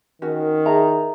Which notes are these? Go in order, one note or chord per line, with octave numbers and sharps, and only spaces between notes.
D#3 C#4 F#4
E4 G#4 A#5